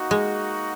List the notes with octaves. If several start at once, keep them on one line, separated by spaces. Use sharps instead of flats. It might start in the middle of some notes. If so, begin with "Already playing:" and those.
Already playing: A#3 D#4 F#4
G#3